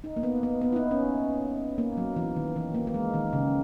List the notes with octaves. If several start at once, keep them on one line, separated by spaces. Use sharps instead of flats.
D#4
A#3
B3
B3
B3
E4
D#4
C#4
A#3
F#3
E3
D#3
E3
A#3
A#3
G#3
D#3
C#3